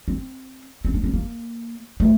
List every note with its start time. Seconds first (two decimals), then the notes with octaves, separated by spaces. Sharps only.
0.08 C4
0.85 C4
0.94 D4
1.04 C4
1.14 A#3
2.00 A3